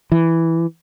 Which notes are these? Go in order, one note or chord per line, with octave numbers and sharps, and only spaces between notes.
E3